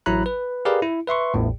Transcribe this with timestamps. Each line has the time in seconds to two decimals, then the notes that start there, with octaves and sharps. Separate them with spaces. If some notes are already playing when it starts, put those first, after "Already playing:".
0.06 A1 F#3 E4 A#5 B5 F#6
0.26 B4
0.65 G4 G#4 A#4 B4 D5 F5
0.82 E4
1.07 B4 E5 C6 C#6
1.34 A1 E2 A2